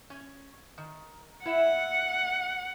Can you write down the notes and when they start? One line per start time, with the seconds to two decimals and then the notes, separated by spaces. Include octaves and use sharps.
0.10 C#4
0.78 D#3
1.46 E4 E5 F#5